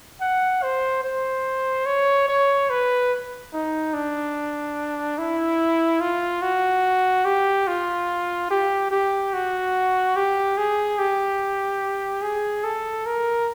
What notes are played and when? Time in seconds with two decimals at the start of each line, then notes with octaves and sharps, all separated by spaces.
0.21 F#5
0.63 C5
1.04 C5
1.86 C#5
2.28 C#5
2.70 B4
3.53 D#4
3.94 D4
5.19 E4
6.01 F4
6.42 F#4
7.25 G4
7.68 F4
8.50 G4
8.91 G4
9.33 F#4
10.16 G4
10.58 G#4
10.98 G4
12.22 G#4
12.64 A4
13.06 A#4